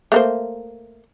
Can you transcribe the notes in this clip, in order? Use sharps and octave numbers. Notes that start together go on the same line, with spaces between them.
A3 A#3 C5